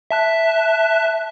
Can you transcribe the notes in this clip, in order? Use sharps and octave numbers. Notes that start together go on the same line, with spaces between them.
E5 A5 F#6